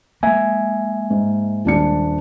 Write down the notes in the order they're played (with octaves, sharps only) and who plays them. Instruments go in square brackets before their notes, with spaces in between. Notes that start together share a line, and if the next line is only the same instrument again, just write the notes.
[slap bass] G#3 A#3 [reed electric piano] E5 G#5
[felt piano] G#2
D#1 D4 C#7